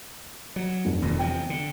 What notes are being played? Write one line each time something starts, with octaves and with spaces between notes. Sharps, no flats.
F#3
F1
E1 D#2 B2
E2 C3 F3 G5
D3